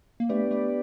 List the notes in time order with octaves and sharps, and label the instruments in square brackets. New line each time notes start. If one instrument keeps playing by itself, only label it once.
[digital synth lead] A#3
[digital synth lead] A3 [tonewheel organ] B3 D4 G4 B4 D5
[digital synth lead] A3